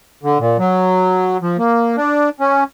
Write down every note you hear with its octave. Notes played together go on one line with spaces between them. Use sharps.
D3
A#2
F#3
F3
A#3
D4
C#4